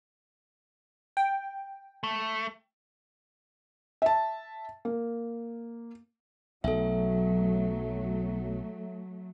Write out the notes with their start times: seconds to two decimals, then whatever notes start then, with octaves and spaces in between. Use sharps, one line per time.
1.17 G5
2.03 A3
4.02 E5 A5
4.85 A#3
6.64 B1 F#3 A3 A4 E5